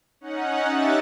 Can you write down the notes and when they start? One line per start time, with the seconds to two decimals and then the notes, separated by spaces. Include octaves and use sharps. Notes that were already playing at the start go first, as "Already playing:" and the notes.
0.21 C#4 D#4 F#5
0.68 C#4 G4 D#5 E5 F#6 A6